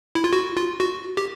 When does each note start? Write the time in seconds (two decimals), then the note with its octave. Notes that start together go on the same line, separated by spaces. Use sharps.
0.15 E4
0.24 F4
0.33 F#4
0.57 F4
0.80 F#4
1.17 G4